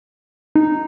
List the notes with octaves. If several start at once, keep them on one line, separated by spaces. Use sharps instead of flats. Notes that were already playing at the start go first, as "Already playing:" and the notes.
D#4